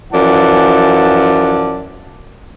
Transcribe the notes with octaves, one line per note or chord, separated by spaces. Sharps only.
F#2 E3 F3 D5 F#5 A5